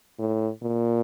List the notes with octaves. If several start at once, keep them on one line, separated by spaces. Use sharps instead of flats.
A2
A#2